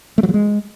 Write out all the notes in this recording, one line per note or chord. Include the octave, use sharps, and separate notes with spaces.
A3
F#3
F3
G#3